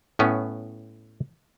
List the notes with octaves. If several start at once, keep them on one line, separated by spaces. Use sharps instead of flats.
A2 B3 C#4